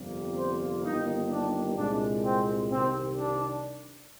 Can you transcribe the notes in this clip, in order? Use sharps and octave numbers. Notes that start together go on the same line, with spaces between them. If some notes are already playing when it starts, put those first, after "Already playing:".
Already playing: G1 F2 C3 G3 A#3
C5
G1 G2 D#3 A#3 D#4
D4
C2 A#2 G#3 D4
C4
C2 C3 D#3 C4
D4